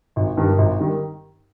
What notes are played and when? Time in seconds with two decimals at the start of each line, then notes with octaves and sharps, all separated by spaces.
0.16 G#1
0.37 G2 D#3 G3
0.58 G#1
0.79 D#3 G3